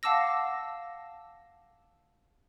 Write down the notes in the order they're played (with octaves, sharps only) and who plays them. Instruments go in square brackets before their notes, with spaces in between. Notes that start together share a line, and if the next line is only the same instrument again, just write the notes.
[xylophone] F5 F#5 A5 D6 E6 A#6